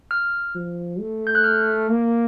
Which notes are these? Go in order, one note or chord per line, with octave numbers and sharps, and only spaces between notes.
F6
F3
A3
G6
F#6
F6
A#3